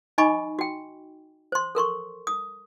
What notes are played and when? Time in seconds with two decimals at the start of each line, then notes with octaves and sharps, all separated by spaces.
0.18 D#4 D#5 G#5 B5 C#6 D6
0.59 F#4 G5
1.52 C5 C6
1.75 A4 A#4 C6 C#6
2.27 D#6